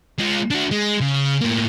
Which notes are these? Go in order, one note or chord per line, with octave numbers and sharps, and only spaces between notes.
G#3 F4
D4 F#4
G#3
C#3
A2 A#3